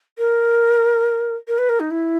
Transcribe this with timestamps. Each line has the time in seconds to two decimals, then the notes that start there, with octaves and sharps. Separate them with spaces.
0.18 A#4
1.47 A#4
1.58 B4
1.69 A#4
1.79 D#4
1.90 E4